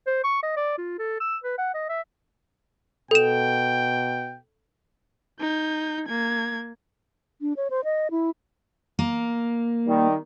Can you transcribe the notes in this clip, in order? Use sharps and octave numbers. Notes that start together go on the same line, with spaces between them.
C5
C#6
D#5
D5
F4
A4
E6
B4
F#5
D#5
E5
B2 A4 G5 E7
D#4 G6
A#3 G#6
D4
C#5
C5
D#5
E4
A#3
D#3 G3